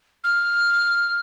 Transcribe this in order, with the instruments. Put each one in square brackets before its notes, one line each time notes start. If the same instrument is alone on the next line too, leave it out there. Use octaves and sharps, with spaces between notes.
[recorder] F6